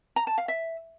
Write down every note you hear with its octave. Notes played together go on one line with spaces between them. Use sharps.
A#5
A5
F5
E5